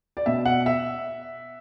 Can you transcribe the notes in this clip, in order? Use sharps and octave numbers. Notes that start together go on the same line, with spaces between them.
D5
B2 E5
F#5
E5